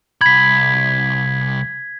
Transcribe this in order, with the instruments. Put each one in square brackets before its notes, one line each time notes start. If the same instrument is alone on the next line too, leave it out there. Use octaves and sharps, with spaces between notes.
[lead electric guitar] C2 B5 [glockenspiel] G#6 B6